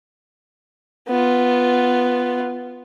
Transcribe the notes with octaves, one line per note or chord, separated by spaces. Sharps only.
B3 F4